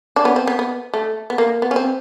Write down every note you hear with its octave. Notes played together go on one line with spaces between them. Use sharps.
D4
B3 C#4
C4
B3
B3
A3
B3
A#3
B3
C#4
C4